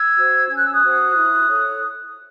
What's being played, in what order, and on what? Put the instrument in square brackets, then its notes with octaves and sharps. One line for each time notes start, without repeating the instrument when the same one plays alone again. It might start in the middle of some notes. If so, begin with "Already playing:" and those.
Already playing: [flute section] E6 G#6
F#4 C5
C#4 G#6
F#6
E6
D#6 F#6
F#4 C5
E4
A4 C#5